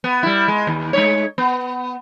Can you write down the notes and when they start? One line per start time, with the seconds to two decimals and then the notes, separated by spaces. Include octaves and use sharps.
0.04 B3
0.23 G3 E4
0.48 G#3
0.67 D#2
0.93 G#3 D#4 C#5
1.38 B3